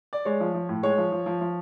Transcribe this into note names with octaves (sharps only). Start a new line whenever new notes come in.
D5
G#3 C#5
F3
F3
A2
G#3 C#5
F3
F3
F3
F3